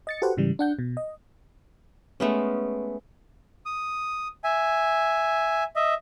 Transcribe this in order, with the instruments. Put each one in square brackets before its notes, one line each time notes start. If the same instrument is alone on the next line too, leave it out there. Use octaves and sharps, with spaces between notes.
[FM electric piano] D#5 A6 C#7
F#4 G4 A4 B4 C5 F#5
G#2 C#3 E3 G3
D4 F#5 G6
B2
D#5
[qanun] G#3 A3 B3 C#4
[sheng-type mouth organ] D#6
E5 G#5
D#5 E5